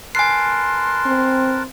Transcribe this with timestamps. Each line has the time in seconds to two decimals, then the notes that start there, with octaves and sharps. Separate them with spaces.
0.15 A#4 B4 G#5 A5 C6 C7
1.05 C4